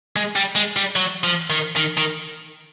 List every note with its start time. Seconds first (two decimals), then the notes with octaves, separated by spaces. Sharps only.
0.16 G#3
0.36 G3
0.55 G#3
0.76 G3
0.96 F#3
1.24 F3
1.50 D#3
1.76 D#3
1.97 D#3